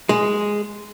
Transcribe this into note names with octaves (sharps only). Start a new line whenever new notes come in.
G#3